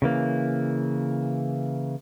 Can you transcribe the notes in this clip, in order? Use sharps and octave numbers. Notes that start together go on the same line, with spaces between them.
C#3 E3 A#3